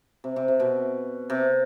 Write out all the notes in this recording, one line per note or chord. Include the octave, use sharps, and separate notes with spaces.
C3
C3
C3
B2
C3